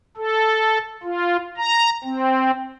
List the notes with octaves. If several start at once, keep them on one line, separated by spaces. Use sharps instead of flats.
A4
F4
A#5
C4